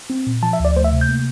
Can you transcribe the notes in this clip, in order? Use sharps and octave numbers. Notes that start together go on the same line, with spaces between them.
C4
A#2
F3 A5
E5
D2 D5
A3 C5
E5
C3
G6
A#3